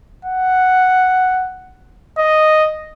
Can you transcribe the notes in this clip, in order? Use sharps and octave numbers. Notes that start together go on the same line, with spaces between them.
F#5
D#5